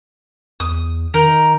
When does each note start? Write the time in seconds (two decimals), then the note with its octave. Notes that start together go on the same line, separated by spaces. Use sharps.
0.60 E2 D#6
1.14 D#3 D#4 A#4